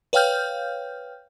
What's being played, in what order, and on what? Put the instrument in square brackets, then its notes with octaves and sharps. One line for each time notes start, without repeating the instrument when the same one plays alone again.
[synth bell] B4 C#5 F5 G5 F6 G6